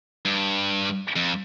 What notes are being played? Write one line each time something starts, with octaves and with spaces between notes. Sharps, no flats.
G2
F2